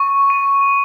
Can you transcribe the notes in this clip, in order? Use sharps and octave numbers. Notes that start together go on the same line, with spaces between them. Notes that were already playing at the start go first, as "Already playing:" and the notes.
Already playing: C#6
D#7